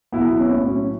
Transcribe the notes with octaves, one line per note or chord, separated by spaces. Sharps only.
B1 B3 E4
C#4
A2 F#3
C#4